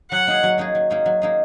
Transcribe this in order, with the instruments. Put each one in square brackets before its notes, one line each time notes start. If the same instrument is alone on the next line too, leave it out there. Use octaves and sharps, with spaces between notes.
[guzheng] F#3 [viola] F#5
[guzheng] A#3 D#4 G#4
F#3
A#3 D#4 G#4
F#3
A#3 D#4 G#4
F#3
A#3 D#4 G#4